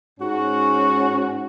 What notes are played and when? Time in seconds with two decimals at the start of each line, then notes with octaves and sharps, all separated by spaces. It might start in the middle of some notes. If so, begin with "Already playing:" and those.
0.19 G#2 C#4 F#4